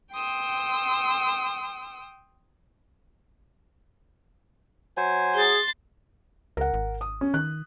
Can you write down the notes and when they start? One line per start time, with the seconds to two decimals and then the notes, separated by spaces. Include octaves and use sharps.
0.12 G5 C6 D#6 E6
4.97 F#3 C5 G#5
5.35 G#4 C6 A6
6.57 C#2 A#4 F#5
6.74 G#1
7.01 D#6
7.21 C#4
7.34 D#3 F#6